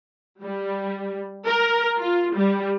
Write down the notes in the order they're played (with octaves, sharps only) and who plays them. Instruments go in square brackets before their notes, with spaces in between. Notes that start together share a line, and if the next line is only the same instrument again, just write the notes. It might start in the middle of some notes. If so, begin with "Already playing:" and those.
[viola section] G3
A#4
F4
G3